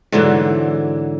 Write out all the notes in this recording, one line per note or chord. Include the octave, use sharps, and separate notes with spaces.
G#2 D3 E3 F#3